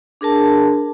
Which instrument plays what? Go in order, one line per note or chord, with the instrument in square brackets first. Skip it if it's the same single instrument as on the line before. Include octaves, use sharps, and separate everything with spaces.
[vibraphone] D4 G#4 A#4 A5